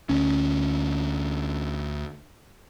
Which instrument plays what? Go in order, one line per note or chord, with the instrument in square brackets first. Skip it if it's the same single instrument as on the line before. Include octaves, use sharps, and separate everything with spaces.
[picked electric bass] D2 C#4